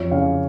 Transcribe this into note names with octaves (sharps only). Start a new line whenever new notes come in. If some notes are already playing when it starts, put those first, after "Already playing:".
Already playing: F2 C#5
C#3 F5